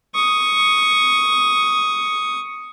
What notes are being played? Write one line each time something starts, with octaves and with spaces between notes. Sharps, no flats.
C#6 D#6